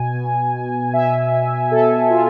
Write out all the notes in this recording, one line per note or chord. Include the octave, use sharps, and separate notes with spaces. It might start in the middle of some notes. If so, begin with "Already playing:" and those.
Already playing: B2 G#5
B2
B2 E5
B2 A4
F4